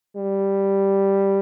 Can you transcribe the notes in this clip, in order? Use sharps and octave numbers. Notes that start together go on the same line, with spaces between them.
G3